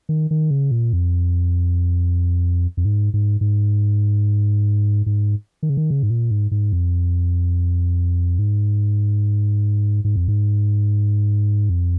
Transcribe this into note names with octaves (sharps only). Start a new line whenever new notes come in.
D#3
D#3
C#3
A#2
F2
F2
G#2
G#2
G#2
G#2
D#3
C#3
D#3
C#3
G#2
A#2
G#2
G#2
F2
G#2
G#2
F2
G#2
F2